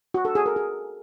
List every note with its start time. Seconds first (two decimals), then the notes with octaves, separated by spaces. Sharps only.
0.14 F#4
0.25 A4
0.35 G#4
0.46 A#4
0.56 G#4